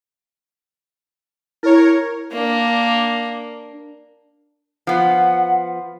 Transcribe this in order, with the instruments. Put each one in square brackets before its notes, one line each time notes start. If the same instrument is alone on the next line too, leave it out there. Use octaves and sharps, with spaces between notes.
[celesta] E4 [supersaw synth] A#4 C#5
[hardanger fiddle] A#3 D4
[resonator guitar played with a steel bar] F3 B3 [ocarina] F#5